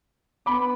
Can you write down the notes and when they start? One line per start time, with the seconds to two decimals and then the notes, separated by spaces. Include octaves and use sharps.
0.46 B3 B5 D6